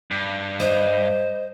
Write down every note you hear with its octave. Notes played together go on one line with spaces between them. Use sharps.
G2
C5 D#5